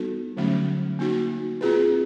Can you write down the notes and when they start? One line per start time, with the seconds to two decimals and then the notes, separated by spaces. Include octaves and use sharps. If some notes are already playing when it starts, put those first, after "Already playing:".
Already playing: G3 B3 D#4 F#4 A4
0.37 D3 F#3 A3 C#4
0.99 A#3 D#4 F#4
1.61 C4 F4 G#4 B4